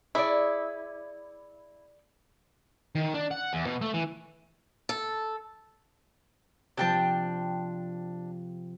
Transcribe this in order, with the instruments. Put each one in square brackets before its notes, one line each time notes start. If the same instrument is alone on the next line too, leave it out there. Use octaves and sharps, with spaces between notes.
[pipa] E4 [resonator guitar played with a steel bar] G#4 C#5 D5
[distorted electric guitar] D#3
D4
F#5
E2
B2
A3
E3
[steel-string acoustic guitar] A4
[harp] C3 F3 [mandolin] D4 G5 A5